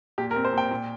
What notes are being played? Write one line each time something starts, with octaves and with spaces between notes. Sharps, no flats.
A#2 G4
A#4
C4
C5
A#2 G5
A#2